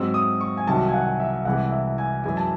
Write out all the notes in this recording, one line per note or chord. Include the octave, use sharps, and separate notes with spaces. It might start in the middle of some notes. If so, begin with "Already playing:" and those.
Already playing: G#2 F#3 C4 E6
D#6
C#6
G#5
C2 C3 D#3 F#3 A5
G#5
F#5
E5
C2 C3 E3 G#3 F#5
E5
G#5
F#2 E3 G#3 G#5
A5